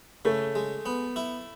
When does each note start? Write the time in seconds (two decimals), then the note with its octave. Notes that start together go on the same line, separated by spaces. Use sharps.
0.25 C#3 A3
0.55 G#3
0.86 B3
1.16 E4